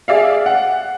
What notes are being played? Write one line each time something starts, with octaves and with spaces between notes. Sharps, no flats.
G#4 D5 E5 F5
F#5